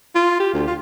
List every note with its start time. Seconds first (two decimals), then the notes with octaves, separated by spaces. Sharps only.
0.15 F4
0.40 G4
0.54 D2
0.68 F4